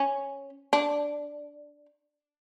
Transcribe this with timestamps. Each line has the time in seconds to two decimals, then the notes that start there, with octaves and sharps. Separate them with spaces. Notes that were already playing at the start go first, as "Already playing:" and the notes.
Already playing: C#4
0.73 D4